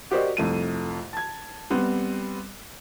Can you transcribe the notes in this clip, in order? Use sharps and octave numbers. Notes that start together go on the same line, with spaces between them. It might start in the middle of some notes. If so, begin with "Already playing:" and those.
F#4 G4 A#4 C5 D5 D#5
C2 F2 A3 D#7
A5 G#6
G3 B3 C4